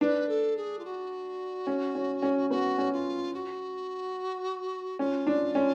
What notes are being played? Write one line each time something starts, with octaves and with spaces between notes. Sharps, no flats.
D4 B4
A4
G#4
F4
F#4
C#4
C#4
C#4
B3 F#4
C#4
F4
F#4
C#4 F4
D4
C#4